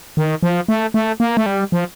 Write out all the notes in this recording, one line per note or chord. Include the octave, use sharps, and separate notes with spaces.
D#3
F3
A3
A3
A#3
A3
G3
F3